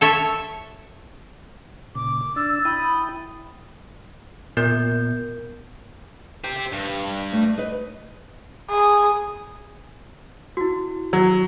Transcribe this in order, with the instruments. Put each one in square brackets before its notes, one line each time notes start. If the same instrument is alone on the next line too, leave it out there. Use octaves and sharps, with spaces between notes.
[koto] A4 C#5 E5
[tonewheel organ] A#2 C#3 [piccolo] D6
[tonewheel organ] D4 [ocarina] E6 [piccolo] A6
[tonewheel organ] E4 G5 D#6 [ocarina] B5
[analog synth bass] A#2 [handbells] B3 A#4 G6
[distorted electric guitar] G4 C5
G2
[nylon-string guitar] A3
B4 D#5
[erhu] G#4
[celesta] E4 F#4
[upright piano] F#3